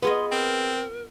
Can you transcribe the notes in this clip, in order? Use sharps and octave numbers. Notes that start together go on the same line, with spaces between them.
B3 F4 G#4 B4 D#5 C6
C4 A#4